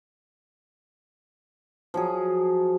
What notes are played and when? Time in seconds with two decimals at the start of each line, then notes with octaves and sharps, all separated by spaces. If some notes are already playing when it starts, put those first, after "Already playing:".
1.94 F3 F#3 G#4